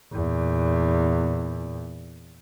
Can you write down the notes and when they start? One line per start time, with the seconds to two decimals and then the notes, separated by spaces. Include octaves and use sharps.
0.13 E2 A#2